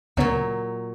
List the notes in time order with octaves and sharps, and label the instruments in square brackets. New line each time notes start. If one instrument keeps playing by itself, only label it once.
[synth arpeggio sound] D2 C#3 B3 [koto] A#2 F#3